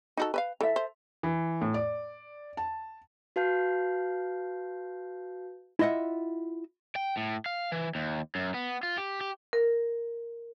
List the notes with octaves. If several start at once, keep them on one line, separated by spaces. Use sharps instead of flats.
D#4 F#4 A4
B4 E5 F5
E3 A4 E5
C5
E3
A2
D5
A5
F#4 B4 F5 A5 G6 C7
E4 F4 D#5 E5 F#5
G5
A2
F5
E3
D#2
F#2
B3
F4
G4
G4
A#4